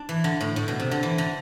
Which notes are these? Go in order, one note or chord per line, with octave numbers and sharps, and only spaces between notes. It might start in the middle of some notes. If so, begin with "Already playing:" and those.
Already playing: D4
E3
D3
A2
A2
B2
C3
D3
E3
D3